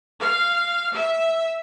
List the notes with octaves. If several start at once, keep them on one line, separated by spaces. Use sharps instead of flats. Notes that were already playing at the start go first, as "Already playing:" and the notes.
F5
E5